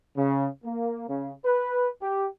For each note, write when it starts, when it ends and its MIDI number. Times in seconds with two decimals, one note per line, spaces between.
0.16 0.47 49
0.64 1.05 58
1.09 1.31 49
1.45 1.89 71
2.01 2.26 67